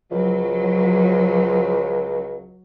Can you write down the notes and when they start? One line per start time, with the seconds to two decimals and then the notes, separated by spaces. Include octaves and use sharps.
0.11 C#2 F3 F#3